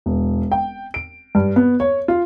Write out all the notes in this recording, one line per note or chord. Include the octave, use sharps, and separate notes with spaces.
E1
G5
D7
G2
B3
C#5
F4